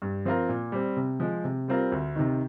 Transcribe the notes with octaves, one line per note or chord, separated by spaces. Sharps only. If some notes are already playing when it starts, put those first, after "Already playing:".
G2
F3 C4 F4 A#4
A#2
G3 C4
C3
F3 G#3
C3
G3 C4 F4 A#4
D2
C3 D#3